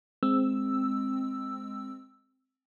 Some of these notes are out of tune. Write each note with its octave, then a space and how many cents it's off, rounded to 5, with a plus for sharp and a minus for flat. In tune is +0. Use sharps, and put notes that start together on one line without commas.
G#3 +0 C4 +0 E6 +0